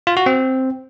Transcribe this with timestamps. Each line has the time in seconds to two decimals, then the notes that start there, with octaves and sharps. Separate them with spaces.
0.07 F4
0.17 F#4
0.26 C4